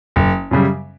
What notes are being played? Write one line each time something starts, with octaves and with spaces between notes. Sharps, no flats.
F#1
F#2 C#3 G3